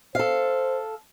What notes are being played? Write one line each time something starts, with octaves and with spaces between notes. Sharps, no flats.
A4 C5 F5